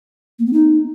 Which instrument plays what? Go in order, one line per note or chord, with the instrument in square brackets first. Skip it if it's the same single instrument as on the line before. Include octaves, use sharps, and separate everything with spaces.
[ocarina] A#3
B3
D#4